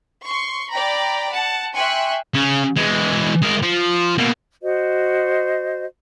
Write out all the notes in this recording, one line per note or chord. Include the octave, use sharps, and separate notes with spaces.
C6 C#6
D5 G5 A#5 B5
F#5 A5
E5 G5 G#5 C6 C#6 F#6
C#3 C#4
E3 G#3
G#3 A#4
F3
B2 A#3
F#4 C5 D#5